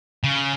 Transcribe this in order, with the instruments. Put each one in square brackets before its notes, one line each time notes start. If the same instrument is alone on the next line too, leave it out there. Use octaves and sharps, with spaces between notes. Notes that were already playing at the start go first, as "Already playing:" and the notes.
[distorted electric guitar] C#3